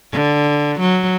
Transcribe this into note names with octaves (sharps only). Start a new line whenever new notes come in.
D3
F#3